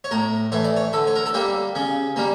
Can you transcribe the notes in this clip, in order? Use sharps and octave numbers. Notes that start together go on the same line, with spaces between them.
C#5
A2 A#4
E3 A3 C#5
D5
C#5
D3 A4
C#5
A#4
A4
G3 A#3 G4
C#3 C#4
G3 A#3